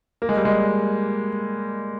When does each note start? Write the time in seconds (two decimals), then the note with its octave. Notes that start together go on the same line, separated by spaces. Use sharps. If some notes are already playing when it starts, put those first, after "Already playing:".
0.22 A#3
0.29 G#3
0.37 G3
0.45 G#3